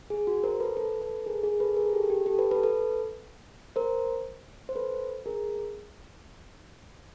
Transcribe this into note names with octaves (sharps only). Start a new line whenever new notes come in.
G#4
F#4
A#4 C5
A4 B4
A4 B4
A4 B4
G#4 A#4
G#4
A4 B4
G#4 A#4
G4 A4
G4
G4 A4
A4 B4
A4 B4
A4 B4
A#4 C5
C5
A4 B4
G#4 A#4